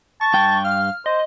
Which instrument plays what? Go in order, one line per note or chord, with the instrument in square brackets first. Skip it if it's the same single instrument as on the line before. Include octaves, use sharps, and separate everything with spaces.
[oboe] A5 [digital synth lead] C#6
[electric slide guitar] G2 G5 [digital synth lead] C#6
[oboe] F5 [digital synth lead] F6
[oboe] C5 [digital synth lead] D#5